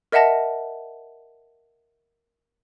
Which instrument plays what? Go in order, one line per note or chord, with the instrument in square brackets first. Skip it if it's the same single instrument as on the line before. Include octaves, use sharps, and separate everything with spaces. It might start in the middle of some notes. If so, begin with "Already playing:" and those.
[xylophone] A#4 D#5 E5 F#5 A5 A#6